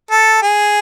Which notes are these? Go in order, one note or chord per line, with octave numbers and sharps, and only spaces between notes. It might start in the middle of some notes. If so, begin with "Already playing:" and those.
A4
G#4